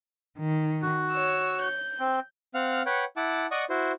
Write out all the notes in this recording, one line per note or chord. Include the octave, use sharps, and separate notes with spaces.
D#3
F#4
C#5 E6
G6
C4
C4 F5 F#5 F6
B4 C#5 F#5 G5
E4 F#5 A5 D6
D5 D#5 F#5 C#6 D#6
E4 F#4 C5